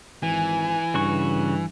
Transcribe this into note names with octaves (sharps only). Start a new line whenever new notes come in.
G#1 E3 G#5
G2 C#3 F#4 C#6